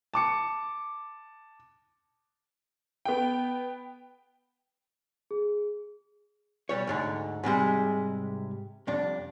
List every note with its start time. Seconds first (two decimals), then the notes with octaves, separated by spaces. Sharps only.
0.14 A5 D6 C#7
3.05 B3 G5
5.31 G#4
6.69 B1 G3 C#5
6.87 D2 G#2 D3
7.44 G#2 C3 G3 G#3
8.87 C2 F2 D4